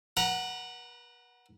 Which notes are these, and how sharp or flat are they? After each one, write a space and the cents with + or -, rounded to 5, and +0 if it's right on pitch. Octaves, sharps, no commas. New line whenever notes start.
B4 -40 F#5 +0 A#5 +0